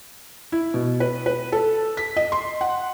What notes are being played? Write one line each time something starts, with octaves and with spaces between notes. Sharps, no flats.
E4
B2
B4
B4
A4
B6
D#5
C6
F#5